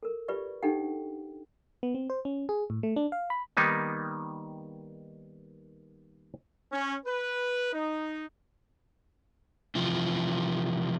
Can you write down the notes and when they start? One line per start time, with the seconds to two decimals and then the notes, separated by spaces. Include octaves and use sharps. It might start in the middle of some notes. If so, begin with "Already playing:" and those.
0.03 A4 A#4
0.28 F4 G4 B4 D5 E5 C#6
0.63 D4 D#4 G4 A4 F#5 G5
1.83 B3
1.95 C4
2.10 C5
2.25 C#4
2.49 G#4
2.70 A2
2.83 A3
2.96 D4
3.12 F5
3.30 B5
3.57 D#3 G3 A#3 B3 D#4
6.72 C#4
7.06 B4
7.73 D#4
9.75 C3 E3 F3